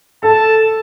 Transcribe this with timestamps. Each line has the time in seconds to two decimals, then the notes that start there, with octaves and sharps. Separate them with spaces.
0.23 A4 A5